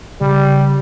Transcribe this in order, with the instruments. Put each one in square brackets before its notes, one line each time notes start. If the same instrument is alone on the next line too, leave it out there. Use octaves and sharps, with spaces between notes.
[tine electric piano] C#3 [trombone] G3